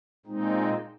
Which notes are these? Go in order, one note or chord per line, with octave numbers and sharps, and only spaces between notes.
A#2 G#3 C4 D#4